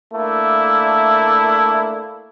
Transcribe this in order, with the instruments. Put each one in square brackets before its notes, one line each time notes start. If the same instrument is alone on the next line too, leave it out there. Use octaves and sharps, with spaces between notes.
[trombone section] A3 A#3 D4 E4